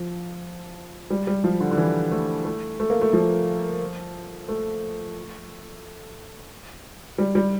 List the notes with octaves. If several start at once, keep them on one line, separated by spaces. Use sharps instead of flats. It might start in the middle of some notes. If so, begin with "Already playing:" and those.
Already playing: F3
G3
G3
F3
D3
D3
E3
A3
A3
A3
A#3
A3
F3
A3
G3
G3